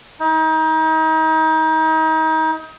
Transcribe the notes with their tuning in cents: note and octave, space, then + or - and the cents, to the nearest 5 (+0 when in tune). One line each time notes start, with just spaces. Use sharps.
D#4 +35